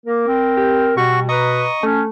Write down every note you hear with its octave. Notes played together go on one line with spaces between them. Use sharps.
A#3 A#4
C4
G4
B2 G3 F#4 C#6
B4 D#5 A#5 C#6 D#6
A3 C#4